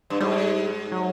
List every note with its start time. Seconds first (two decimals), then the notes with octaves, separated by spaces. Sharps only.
0.10 G2
0.20 G#2 G3
0.92 F#3